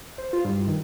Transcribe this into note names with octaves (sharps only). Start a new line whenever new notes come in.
C5
F4
G2
D#3